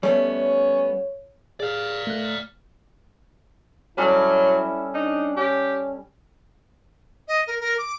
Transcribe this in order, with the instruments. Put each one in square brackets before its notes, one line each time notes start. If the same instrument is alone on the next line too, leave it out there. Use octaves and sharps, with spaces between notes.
[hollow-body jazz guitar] G3 A3 B3 [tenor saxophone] C#4 [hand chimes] C#5
[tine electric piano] G4 G#4 [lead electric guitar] D5 F5
[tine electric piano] A3 F#6
[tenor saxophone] F#3 [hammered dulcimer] G3 C#4 A4 [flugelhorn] E4
[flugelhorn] D4 [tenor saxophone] D#4
[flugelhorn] C#4 [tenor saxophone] G4
[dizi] D#5
A#4
A#4
D6